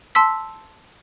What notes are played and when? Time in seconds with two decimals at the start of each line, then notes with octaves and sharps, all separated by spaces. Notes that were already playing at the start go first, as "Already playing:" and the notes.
0.15 A5 C6 E6 B6